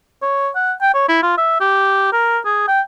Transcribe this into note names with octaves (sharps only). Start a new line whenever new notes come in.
C#5
F#5
G5
C#5
E4
F4
E5
G4
A#4
G#4
G5